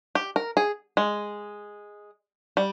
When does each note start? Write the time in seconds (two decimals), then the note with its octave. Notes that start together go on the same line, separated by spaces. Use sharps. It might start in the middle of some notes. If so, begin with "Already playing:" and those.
0.15 G4
0.36 A#4
0.57 G#4
0.97 G#3
2.57 G3